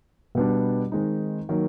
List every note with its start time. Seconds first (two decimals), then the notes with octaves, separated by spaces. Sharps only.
0.35 B2 G3 B3 D4
0.92 D#3 G#3 C4 D#4
1.49 D#3 F#3 A#3